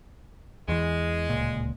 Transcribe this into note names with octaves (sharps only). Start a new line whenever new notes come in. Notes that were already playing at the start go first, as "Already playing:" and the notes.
E2 E3 G#3
D1 C#2 A#2